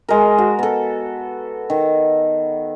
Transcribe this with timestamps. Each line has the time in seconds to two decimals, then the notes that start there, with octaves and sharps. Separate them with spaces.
0.09 G#3 A#4
0.38 F#4
0.59 B3 A4
1.70 D#3